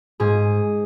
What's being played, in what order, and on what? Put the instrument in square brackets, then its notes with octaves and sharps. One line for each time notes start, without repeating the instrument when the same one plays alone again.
[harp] G#2 G#4